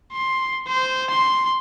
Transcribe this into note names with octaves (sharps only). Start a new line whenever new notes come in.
C6
C5
C6